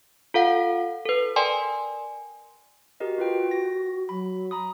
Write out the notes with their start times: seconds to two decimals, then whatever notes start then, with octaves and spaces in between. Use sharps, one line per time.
0.34 F4 A4 F5 F#5
1.06 A4 B4
1.36 A#4 D5 G5 G#5 C6
3.00 F#4 G4 A#4 D#5
3.18 F4 B4 G5
3.51 A#6
4.09 F#3 B5
4.51 A#5 B5 D#6